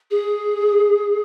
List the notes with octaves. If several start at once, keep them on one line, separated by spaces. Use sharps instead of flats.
G#4